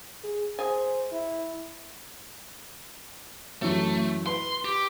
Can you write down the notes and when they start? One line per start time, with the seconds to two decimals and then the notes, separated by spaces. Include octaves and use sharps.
0.24 G#4
0.59 G#4 C5 E5 G#5
1.12 E4
3.62 F#2 E3 A3
4.26 B4 C6
4.65 G4